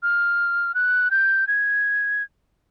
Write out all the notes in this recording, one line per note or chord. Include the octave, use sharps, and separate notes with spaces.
F6
F#6
G6
G#6